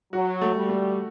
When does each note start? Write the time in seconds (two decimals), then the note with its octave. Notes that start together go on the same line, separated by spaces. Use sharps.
0.13 F#3 F#4
0.41 A3
0.55 G3
0.69 A3